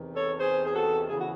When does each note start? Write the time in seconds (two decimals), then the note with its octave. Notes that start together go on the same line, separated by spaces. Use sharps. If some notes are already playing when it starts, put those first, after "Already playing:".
Already playing: E2 C3 D#3
0.15 A4 C#5
0.38 G#4 C5
0.64 G#4
0.74 F#4 A4
1.09 E2 C#3 E3 G#4
1.18 F#4